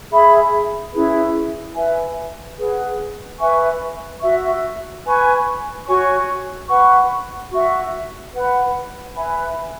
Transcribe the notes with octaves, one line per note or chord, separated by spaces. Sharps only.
G#4 E5 B5
C#4 E4 G#4 B4
B4 E5 G#5
G#4 B4 F#5
B4 E5 G#5 C#6
F#4 E5 C#6
B4 G#5 C#6
F#4 C#5 G#5 C#6
B4 F#5 C#6
F#4 E5 C#6
B4 F#5 B5
B4 E5 G#5 B5